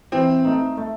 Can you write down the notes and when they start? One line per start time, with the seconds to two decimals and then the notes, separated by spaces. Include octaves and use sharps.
0.12 E3 C4
0.45 A3 D#4
0.78 A3